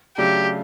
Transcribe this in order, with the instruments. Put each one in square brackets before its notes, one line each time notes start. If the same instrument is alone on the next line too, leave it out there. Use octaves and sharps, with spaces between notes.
[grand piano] C#3 F#3 A3 D4 [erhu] G4